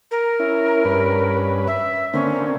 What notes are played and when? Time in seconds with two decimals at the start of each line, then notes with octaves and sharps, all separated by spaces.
0.11 A#4
0.40 C#4 E4
0.85 G2 C#4 B4
1.67 E5
2.14 D3 A#3 C4 C#4